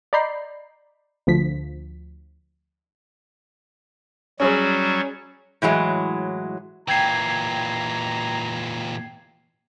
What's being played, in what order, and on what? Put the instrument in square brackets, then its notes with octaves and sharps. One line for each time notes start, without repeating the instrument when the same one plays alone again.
[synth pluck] D5 D#5 A#5 B5 G6 C7
D2 F3 B6
[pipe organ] F#3 G3 F#4 [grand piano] C#4 G#4 C#5
[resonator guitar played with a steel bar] A2 E3 F#3 G#3
[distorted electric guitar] A#2 E3 [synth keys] G5 G#6 C7 [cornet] A#5